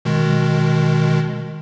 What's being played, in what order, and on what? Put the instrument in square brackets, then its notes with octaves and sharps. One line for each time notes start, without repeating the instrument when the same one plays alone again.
[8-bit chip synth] B2 D#3 G#3